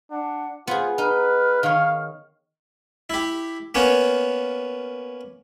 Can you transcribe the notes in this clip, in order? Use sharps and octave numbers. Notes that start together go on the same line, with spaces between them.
D4 F#5
B3 F4 G#4 C5
D#4 B4 F6
D#3 C#5 F5
E4 G4
A#3 B3 C#4 C#5